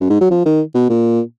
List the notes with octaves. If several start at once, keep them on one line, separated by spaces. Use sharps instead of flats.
F#2
G#2
F#3
F3
D#3
B2
A#2